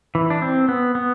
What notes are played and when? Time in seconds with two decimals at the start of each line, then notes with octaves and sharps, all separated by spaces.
0.15 E3
0.30 D4
0.42 C4
0.69 B3
0.95 B3